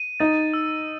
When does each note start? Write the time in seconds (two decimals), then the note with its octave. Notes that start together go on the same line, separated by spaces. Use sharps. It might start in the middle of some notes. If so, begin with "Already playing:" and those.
Already playing: D#7
0.20 D#4 A6
0.54 E6